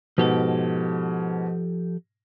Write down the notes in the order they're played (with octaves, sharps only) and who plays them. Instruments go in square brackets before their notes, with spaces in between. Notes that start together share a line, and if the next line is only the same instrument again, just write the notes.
[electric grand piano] G#2 B2 [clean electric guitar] F3 G4 A4